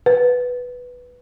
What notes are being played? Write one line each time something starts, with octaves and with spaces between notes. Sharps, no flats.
B4